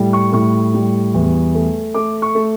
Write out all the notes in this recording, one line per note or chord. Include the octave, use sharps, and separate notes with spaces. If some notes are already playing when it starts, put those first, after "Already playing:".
Already playing: A2 G3
C#6
A2 C#6
G3
E2
A3
A3 D6
C#6
A3